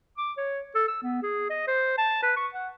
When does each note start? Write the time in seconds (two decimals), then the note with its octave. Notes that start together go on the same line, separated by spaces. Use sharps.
0.18 D6
0.37 C#5
0.75 A4
0.88 E6
1.03 B3
1.23 G#4
1.50 D#5
1.68 C5
1.98 A5
2.23 B4
2.37 C#6
2.54 F#5